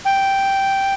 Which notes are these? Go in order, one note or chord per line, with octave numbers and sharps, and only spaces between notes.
G5